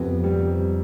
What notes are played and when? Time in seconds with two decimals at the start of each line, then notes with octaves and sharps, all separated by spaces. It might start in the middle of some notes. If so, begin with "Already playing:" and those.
Already playing: F2 C3 B3
0.24 G3